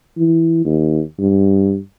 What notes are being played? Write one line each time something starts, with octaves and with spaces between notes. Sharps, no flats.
E3
D#2
G2